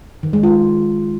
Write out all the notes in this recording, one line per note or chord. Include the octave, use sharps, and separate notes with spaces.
D#3
G#3
F4